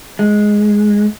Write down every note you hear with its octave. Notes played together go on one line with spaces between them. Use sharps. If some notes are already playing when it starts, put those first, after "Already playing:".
G#3